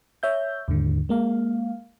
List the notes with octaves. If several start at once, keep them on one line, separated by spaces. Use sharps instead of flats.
C#5 E5 G6
D#2 G#2 D3
G#3 A#3 F5